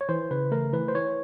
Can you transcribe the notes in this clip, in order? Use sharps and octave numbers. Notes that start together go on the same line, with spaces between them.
C#5
E3 C5
C#3 B4
A3 A#4
E3 B4
C5
E3 C#5